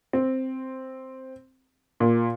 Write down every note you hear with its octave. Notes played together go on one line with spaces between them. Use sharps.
C4
A#2